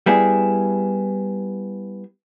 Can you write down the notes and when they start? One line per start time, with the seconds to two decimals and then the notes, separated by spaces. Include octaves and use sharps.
0.06 G3 B3 E4 G#4